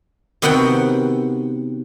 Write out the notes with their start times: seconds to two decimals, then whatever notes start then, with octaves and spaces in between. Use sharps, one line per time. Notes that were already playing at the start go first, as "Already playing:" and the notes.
0.42 C3 D#3 B3 F#4 F#5 G5